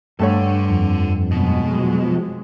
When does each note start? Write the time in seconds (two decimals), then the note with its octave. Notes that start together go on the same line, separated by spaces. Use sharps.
0.20 G2 A3 A4 C#5 F#5
0.70 F2
1.31 F1 B2 F#3 G#3
1.80 F3